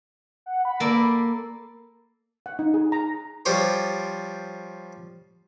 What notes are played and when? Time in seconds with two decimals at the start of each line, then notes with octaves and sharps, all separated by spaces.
0.46 F#5
0.65 B5
0.80 A#3 A4 D5
2.46 F#5
2.59 D#4
2.74 G#4
2.92 A#5
3.45 F3 G3 G4 C5 C#5